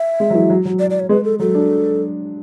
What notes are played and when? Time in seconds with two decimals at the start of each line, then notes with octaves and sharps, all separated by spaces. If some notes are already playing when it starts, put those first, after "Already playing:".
Already playing: E5
0.20 G#3
0.30 F#3
0.35 E3
0.50 F#3
0.65 F#3
0.79 D5
0.90 D5
1.00 C#5
1.09 G#3 B4
1.24 A4
1.39 F#3 A4
1.55 D4